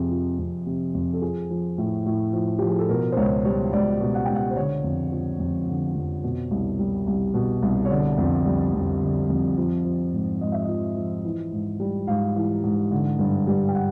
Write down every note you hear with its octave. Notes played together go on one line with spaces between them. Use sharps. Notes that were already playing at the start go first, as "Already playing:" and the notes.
Already playing: F2 C3 G#4
F3
F2
C3
F2
A4
F3 G#4
F3
A2
A2
F3
F3 G4
G#4
A4
B2 A#4
C5
C#2 C#5
G3 C#5
C#2 D5
B2
F#5
C#2 G5
F#5
C5
D3 C#5
F2
F3
F2
D3
F2
B2
C2
G3
C2
B2
C2
C#5
D3 D5
F2
G3
F2
D3
F2
F3
F3
G#2
G#2 D#5
E5
D#5
F3
F3
E3
G#2
G3
G#2 F5
E3
G#2
D3
G2
G3
G5
F#5